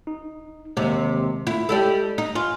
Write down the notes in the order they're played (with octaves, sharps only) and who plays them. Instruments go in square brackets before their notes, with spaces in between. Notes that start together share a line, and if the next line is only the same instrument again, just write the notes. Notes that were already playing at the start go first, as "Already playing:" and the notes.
[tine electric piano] D#4
[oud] D#2 C3 [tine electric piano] D#3 G#3
[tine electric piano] A3 F4 [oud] E4
[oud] G3 E4 A4 [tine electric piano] G#3
[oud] D#4
[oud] F4 [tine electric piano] G#5